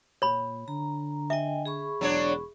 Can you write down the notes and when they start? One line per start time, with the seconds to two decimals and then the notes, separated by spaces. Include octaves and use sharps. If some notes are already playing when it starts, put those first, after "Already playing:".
0.22 A#2 C#5 B5
0.68 D3 A#5
1.30 D#5 E5 G5 G#5
1.66 G#4 B5 C#6
2.01 E1 F#3 D4 C#5